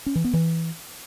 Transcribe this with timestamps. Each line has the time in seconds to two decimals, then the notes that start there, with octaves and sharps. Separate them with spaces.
0.06 C#4
0.15 E3
0.24 B3
0.33 E3